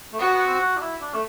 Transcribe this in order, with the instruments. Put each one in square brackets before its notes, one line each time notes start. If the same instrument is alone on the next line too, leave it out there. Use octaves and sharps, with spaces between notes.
[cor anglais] A3
[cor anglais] B3 [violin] F#4
[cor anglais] B3
C4
F#4
D4
E4
D4
A3